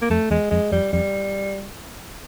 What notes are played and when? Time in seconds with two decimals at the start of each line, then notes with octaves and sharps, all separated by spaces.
0.02 A#3
0.10 F2 A3
0.31 E2 G#3
0.51 F2 G#3
0.72 F2 G3
0.93 F2 G3